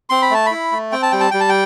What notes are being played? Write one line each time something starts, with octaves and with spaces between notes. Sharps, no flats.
C4 C6
B5
A3 A5
E4 B5
A3
C4 G5
A5
G3 G5
A5
G3 G5
A5
G5